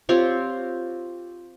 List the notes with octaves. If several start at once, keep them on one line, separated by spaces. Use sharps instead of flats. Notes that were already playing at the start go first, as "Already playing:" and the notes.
C4 F4 G4 C#5